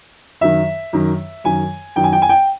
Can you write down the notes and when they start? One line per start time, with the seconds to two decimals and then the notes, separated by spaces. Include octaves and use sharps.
0.41 F#2 D#3 E5
0.93 F#2 D#3
1.44 F#2 D#3 G#5
1.96 F#2 D#3 G5
2.04 G#5
2.13 G5
2.22 G#5
2.29 G5